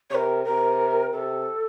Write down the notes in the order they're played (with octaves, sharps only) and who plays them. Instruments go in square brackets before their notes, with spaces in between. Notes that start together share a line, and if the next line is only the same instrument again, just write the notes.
[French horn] C3 [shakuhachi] A#4 C#5
[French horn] C3 [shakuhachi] A#4
[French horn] C3 [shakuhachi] A4